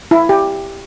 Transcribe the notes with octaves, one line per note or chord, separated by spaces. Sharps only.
E4
G4